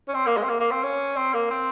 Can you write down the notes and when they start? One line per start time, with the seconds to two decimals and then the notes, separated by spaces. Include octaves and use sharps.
0.08 C#4
0.15 C4
0.27 A#3
0.37 G#3
0.43 C4
0.49 A#3
0.60 A#3
0.71 C4
0.83 C#4
1.17 C4
1.34 A#3
1.51 C4